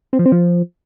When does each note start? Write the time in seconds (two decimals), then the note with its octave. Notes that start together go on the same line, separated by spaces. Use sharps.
0.13 C4
0.19 F3
0.26 C4
0.32 F3